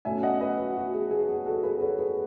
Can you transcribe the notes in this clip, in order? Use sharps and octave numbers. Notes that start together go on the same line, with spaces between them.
B2 A3 C#4 E5 G#5
D#5 F#5
B4 D#5
F#4
F#4
G#4
G#4
G#4
F#4 A4
G#4 B4
A4 C#5
G#4 B4